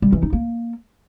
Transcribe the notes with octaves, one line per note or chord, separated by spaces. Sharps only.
G3
E3
D#4
A#3